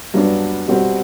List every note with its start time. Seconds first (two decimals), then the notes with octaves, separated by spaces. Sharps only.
0.14 G2 F#3 B3 D4
0.67 B2 G3 C4 F#4